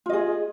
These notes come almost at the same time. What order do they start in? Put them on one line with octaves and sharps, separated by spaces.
F4 D#5 G#4